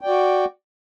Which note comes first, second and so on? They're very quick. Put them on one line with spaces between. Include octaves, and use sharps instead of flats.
G5 D5 F#4